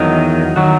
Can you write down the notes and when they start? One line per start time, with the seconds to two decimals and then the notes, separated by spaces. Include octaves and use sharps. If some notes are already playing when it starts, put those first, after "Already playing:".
Already playing: E2 D#3 F#3 D#4
0.56 D#3 F#3 F#4